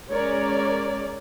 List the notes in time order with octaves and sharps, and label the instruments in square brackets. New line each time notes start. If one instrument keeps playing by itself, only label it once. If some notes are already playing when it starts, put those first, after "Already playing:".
[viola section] G#3 C#4 A#4 C#5 D5